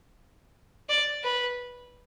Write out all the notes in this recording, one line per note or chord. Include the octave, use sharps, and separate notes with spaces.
D5
B4